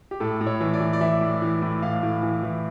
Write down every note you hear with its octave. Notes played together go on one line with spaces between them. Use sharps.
G4
A2 A4
A2
C#5
E3
D5
E3
D5
E3 E5
A2
E3
A2
A2 F5
A2
E3
E3